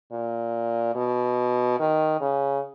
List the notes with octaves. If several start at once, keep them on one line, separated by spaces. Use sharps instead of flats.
A#2
B2
D#3
C#3